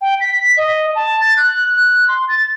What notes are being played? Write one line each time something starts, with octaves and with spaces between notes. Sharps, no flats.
G5
B6
D#5
A5
A6
F#6
F#6
C6
A6